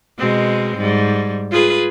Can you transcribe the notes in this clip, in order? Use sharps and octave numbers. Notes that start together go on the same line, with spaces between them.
B2 G#3 C4
G#2 G3
F4 G#4 B4